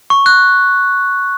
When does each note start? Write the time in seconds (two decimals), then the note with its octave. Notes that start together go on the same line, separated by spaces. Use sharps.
0.10 C#6
0.26 F#6